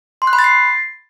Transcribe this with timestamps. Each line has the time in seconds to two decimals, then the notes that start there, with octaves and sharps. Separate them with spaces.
0.22 C6
0.27 F#6
0.33 B5
0.39 A6
0.44 C7